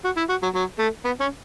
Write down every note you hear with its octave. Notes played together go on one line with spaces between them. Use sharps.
F#4
E4
F#4
F#3
F#3
A3
B3
C#4